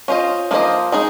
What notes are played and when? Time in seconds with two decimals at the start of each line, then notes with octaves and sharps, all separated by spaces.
0.08 C#4 F4 C5 D#5
0.51 F3 A#3 F4 C5 D#5
0.92 G#3 D#4 G#4